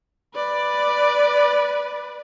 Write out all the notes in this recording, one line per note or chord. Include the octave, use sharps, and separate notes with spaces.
B4 D5